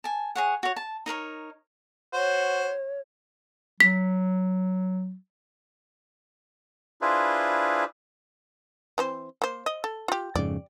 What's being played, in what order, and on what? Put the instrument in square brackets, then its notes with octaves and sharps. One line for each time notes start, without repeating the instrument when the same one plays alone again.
[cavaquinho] G#5 A5
G#4 C#5 F#5
F#4 C#5
A5
D#4 A#4 B4 C#5
[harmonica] F#4 C5 [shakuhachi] C#5
[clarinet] F#3 [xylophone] B6
[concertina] D4 E4 F4 G#4 B4 C5
[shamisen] E3 C4 C5
A#3 C5
D#5
A4
F4 G4
[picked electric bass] F2 G#2 C#3 [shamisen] D5